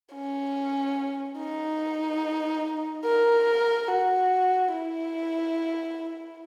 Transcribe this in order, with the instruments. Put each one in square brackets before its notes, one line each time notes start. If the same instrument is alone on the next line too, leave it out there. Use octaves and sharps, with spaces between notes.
[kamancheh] C#4
D#4
A#4
F#4
E4